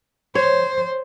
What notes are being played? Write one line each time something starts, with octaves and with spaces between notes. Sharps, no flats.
C5 C#5